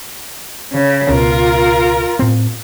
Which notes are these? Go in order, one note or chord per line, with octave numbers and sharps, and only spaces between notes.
C#3
C#2 B2 F4 A#4
A2 C4